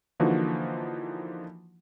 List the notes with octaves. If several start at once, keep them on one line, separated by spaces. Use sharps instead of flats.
D3 E3 F3 A#3 D#4 F#4